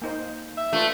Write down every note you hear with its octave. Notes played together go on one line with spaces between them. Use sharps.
A#3 D#4 C5
E5
A3 D4 F4 B4